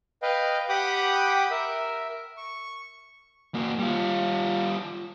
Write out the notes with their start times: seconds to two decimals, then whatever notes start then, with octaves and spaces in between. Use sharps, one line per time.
0.22 B4 D#5 F5 G5
0.69 G4 F#5 G5 B5 D6 D#6
1.51 A#4 E5
2.37 C#6
3.54 A#3 F#4
3.79 G3 F4